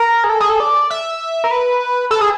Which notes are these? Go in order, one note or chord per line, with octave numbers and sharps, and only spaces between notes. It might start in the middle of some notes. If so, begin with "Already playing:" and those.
Already playing: A#4
G#4
A4
G#4
A4
D5
E5
A#4
B4
A4
G#4